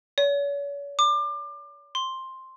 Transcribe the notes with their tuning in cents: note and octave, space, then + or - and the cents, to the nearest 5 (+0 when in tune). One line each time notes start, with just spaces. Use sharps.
C#5 +40
D6 +30
C6 +5